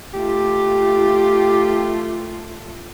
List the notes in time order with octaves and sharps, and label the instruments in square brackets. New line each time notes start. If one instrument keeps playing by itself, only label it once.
[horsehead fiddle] A3 F4 [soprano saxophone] G4